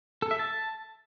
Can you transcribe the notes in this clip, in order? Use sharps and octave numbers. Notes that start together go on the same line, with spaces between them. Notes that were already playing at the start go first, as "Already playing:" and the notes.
A4
E5
A5